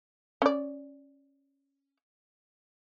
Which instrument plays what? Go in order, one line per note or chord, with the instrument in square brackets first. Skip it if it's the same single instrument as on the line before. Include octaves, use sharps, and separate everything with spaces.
[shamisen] C#4 D5